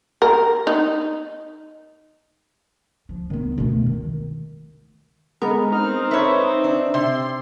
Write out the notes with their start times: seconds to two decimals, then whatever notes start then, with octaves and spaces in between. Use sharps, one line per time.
0.22 A#4
0.67 D#4
3.09 F3
3.30 D#3 B3
3.58 B2 A3
3.86 D#3
5.42 G#3 B3 A#4
5.72 C4 D#4 F6
6.11 B4 C#5 E5
6.64 D4
6.94 C3 C6